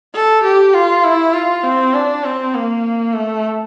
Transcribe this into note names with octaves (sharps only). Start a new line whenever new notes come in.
A4
G4
F4
E4
F4
C4
D4
C4
A#3
A3